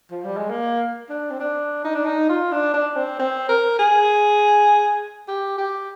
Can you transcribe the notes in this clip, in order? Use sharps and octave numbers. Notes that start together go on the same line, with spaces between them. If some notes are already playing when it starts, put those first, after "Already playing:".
F3
G3
G#3
A#3
D4
C4
D4
D#4
D4
D#4
F4
D4
D4
C4
C4
A#4
G#4
G4
G4